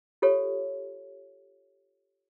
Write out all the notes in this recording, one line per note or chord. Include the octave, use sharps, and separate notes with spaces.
F4 G4 A4 C#5